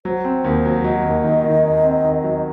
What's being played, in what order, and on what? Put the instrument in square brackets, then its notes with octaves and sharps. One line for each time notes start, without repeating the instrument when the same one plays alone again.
[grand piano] F#3 [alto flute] C5
[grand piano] C4
D#2
F#3
[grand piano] F#3 [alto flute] D#5
[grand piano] D#2
D#3
D#3
D#2
C4
D#3
F#3